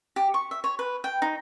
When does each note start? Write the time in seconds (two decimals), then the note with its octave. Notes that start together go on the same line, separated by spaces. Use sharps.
0.16 G4
0.34 C#6
0.51 E5
0.64 C#5
0.79 B4
1.04 G5
1.22 D#4